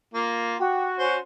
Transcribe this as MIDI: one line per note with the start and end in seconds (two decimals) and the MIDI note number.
0.14 0.56 58
0.14 0.56 65
0.60 1.16 66
0.60 0.87 67
0.99 1.17 61
0.99 1.17 72